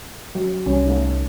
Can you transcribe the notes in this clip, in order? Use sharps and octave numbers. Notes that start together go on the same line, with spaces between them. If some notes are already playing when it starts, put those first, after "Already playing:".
F#3
C2 E3 G3 C#4
A3 D#4